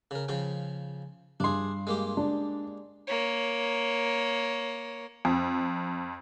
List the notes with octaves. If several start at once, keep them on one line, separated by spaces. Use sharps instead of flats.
C#3 A#4
C#3 F3 G5
G2 D4 G#4 C6
G#3 A#3 G4
D4
A#3 C#5
F2